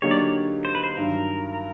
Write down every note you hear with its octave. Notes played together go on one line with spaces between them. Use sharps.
D3 F#3 A#3 D#4 G4 C#5
D5
C#5
C5
B4
C5
G2 D#3 F#3 A#4